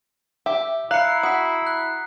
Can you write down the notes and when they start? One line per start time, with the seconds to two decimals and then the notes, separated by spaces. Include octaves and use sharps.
0.46 G4 E5
0.91 E4 F5 A#5 F#6 C7 C#7
1.23 F#4 D#6 B6
1.67 F#6